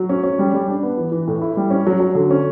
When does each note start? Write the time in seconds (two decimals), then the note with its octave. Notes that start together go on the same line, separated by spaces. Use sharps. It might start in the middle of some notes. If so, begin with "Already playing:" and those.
Already playing: F#3
0.09 C#4
0.23 C#4
0.39 G3
0.54 G3
0.68 D4
0.83 B3
0.97 E3
1.12 E3
1.27 A2
1.42 E4
1.57 G3
1.71 C#4
1.86 F#3
2.00 F#3
2.15 D3
2.31 C#4